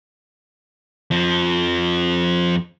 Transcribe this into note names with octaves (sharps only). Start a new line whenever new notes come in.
F2 F3